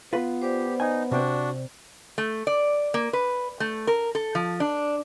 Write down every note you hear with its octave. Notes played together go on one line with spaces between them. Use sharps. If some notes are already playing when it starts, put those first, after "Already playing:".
B3 F4 B4
G4 C5 D5
D#4 G#5
C3 C4 D4 F#4
A3
D5
A#3
B4
A3
A#4
A4
F3
D4